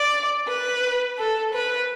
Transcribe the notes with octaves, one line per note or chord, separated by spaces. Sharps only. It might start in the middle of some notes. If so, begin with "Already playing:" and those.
Already playing: D5
B4
A4
B4